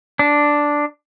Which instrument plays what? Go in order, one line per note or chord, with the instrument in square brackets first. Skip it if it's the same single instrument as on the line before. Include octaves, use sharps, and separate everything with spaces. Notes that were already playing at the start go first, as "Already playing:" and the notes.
[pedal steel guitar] D4